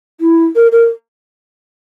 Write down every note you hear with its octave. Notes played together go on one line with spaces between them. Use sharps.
E4
A#4
A#4